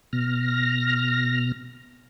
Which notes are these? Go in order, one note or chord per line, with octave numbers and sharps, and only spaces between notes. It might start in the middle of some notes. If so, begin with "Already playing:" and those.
B2 F6 A#6